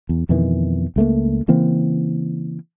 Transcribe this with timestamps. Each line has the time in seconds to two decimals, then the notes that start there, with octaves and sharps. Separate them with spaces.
0.09 E2
0.29 F2 B2 D#3 E3
0.96 C#2 A3 A#3
1.48 C#3 E3 A#3 C4